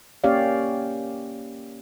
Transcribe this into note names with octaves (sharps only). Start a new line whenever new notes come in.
A#3 C#4 G4 C#5 D5 F5